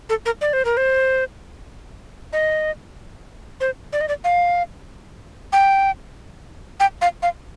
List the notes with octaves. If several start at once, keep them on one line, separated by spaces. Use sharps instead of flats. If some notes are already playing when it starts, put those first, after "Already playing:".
A4
A#4
D5
C5
A#4
C5
D#5
C5
D5
D#5
D5
F5
G5
G5
F5
F5